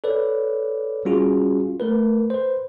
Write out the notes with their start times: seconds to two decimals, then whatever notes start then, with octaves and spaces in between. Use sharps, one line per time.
0.04 A4 B4 C#5 D5
1.05 G3 C#4 F4 F#4 G#4
1.80 A3 A#4 B4
2.30 B4 C5